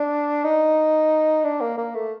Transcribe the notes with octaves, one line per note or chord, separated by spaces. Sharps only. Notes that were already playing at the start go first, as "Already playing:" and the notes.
Already playing: D4
D#4
D4
A#3
A#3
A3